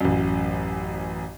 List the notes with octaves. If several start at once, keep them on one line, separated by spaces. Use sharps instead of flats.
A1 F#2